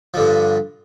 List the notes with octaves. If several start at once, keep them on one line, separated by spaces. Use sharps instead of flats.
G2 D3 F3